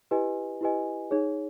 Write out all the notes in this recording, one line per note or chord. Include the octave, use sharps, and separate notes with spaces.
E4 G4 B4 D#5 G#5
E4 G4 B4 D#5 G#5
D#4 G#4 C#5